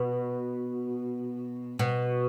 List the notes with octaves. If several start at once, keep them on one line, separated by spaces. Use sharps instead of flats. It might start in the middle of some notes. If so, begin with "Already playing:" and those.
Already playing: B2
B2